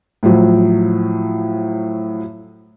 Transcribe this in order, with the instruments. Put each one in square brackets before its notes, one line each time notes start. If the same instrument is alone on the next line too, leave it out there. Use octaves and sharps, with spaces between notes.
[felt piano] A2 F3 F#3